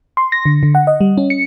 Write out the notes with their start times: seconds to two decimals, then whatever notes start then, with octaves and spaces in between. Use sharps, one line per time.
0.17 C6
0.32 A#6
0.46 D3
0.63 D3
0.75 F#5
0.87 D#5
1.01 G3
1.18 C#4
1.30 C#7